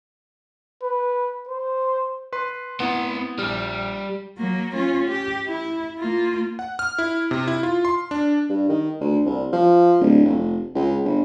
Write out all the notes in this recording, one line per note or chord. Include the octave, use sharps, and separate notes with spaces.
B4
C5
B4 C6
B3 C4 E4 F#5
A#1 G3 F6
F#3 A#3
C#4 F4
G4
E4
A#3 F4
F#5
F6
E4
C3
E4
F4
C6
D4
G2
D#3
D2
C2
F3
D1
F1
C#2
G1